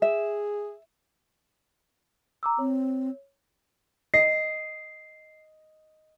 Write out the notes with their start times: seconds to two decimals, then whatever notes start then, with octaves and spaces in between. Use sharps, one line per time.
0.02 G#4 E5
2.43 A#5 D6 E6
2.59 C4 C#5
4.14 D#5 C7